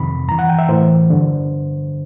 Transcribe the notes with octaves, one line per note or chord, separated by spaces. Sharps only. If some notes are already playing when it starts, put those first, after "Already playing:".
Already playing: F2 C3 D#3 B5
G2 E3 A#5
F#5
G5
E5
A2 E3 C5
G2 D3